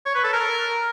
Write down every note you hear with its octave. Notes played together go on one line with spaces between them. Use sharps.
C#5
B4
A4
A#4